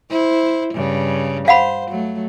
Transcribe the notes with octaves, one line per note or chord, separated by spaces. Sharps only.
E4 C5
G2 C#3
C5 F5 F#5 B5
F#3 A3